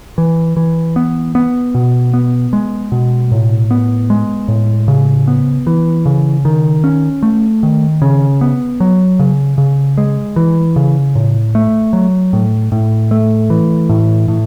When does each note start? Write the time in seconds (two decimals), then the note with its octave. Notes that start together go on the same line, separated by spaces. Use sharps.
0.18 E3
0.57 E3
0.96 B3
1.35 B3
1.75 B2
2.14 B3
2.53 G#3
2.92 B2
3.32 A2
3.71 B3
4.10 G#3
4.48 A2
4.88 C#3
5.27 B3
5.67 E3
6.06 C#3
6.45 D#3
6.84 C#4
7.23 A3
7.63 D#3
8.02 C#3
8.41 B3
8.80 F#3
9.19 C#3
9.58 C#3
9.98 G#3
10.36 E3
10.76 C#3
11.15 A2
11.55 A3
11.93 F#3
12.33 A2
12.72 A2
13.11 A3
13.50 E3
13.89 A2
14.28 A2